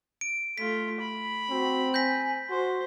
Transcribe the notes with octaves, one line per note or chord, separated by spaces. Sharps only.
D7
A3 F4 B6
B5
C4 F#4
G#5 G6 A#6 B6
F#4 C5 C6